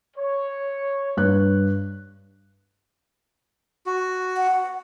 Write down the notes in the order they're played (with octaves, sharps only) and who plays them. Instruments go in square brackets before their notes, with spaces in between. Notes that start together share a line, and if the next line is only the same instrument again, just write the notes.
[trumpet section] C#5
[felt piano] G2 F#6
[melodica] F#4
[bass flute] F#5